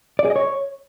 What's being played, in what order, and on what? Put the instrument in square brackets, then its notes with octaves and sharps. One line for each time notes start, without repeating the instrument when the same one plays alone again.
[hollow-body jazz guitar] D5
G#4
D#5
C#5